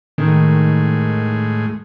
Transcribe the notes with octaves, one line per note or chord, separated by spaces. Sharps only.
A2 D#3 G#3